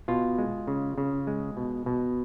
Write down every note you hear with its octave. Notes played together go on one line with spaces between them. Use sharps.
B2 F4
G#3
C#3
C#3
G#3
B2
B2